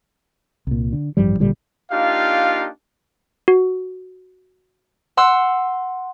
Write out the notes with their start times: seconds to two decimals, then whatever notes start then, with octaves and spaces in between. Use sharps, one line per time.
0.67 C2 A#2
0.92 D3
1.17 A1 G2 F3 G3
1.39 G#1 A#2 D3 G3
1.91 A#3 D4 D#4 F4 G4 F5
3.48 F#4
5.17 F#5 C6 E6